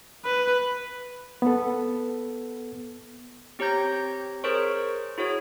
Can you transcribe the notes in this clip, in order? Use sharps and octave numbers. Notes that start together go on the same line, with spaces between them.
B4
B3 A4
C4 G4 C#5 A#5 G6 A#6
G#4 A#4 C5 C#5 C#6
E4 F#4 G#4 C#5